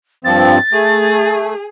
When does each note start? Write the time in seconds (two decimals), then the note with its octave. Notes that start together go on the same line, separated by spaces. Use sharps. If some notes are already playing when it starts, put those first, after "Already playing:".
0.25 G2 F3 C4 A6
0.72 A3 G#4